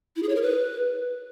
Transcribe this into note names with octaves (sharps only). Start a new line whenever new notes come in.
E4
G#4
C#5
A#4
B4